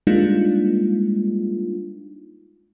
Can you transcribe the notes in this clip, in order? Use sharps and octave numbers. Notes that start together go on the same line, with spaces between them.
G3 G#3 A#3 D4 D#4 F4